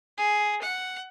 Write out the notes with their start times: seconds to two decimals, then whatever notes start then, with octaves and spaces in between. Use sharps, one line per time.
0.18 G#4
0.62 F#5